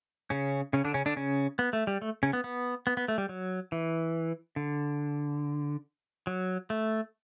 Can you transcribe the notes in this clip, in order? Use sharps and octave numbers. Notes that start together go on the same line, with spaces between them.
C#3 C#4
C#3 C#4
D3 D4
C#3 C#4
D3 D4
C#3 C#4
B3
A3
G3
A3
C#3 C#4
B3
B3
B3
B3
A3
G3
F#3
E3
D3
F#3
A3